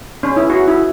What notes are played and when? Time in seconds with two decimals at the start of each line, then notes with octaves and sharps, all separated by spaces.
0.23 C#4
0.36 E4
0.50 F#4
0.68 E4